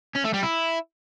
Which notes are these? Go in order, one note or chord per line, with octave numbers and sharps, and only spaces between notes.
C#4
A3
G3
E4